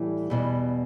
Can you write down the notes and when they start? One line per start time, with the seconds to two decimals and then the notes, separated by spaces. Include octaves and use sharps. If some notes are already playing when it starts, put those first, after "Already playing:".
Already playing: A2 E3 G3
0.30 E2 B2 G3